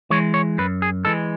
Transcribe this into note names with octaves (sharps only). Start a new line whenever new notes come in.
E3 G#3 C#5
C#5
F#2 B4
G#4
E3 G#3 A4